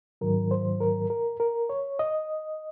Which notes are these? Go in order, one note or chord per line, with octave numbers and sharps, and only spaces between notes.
G#2 D#3 F#3 A#4
C5
A#4
A#4
A#4
C#5
D#5